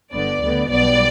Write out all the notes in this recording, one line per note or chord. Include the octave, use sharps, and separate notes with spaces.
G1 G2 D3 B3 D5
D2 D3 G3 B3
B1 B2 G3 B3 D5